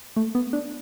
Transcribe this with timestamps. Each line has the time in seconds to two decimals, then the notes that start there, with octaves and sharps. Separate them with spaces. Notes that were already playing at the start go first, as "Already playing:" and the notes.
0.16 A3
0.35 B3
0.53 D4